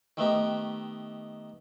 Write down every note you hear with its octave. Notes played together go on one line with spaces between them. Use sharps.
D#3 A3 B3 D#4 G4